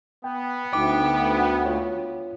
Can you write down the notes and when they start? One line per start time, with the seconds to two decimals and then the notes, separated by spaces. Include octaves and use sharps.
0.24 B3 G5
0.73 D2 D#4 G5 D6
1.65 F4 C#5